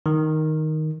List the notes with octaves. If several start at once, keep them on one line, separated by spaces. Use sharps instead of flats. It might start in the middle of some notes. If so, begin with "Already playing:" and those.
D#3